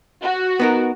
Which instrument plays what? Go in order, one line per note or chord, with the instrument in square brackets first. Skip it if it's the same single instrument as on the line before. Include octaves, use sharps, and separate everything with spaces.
[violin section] F#4
[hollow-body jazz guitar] B3 D#4 A#4